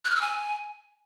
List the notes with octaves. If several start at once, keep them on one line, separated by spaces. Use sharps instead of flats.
F#6
F6
E6
G#5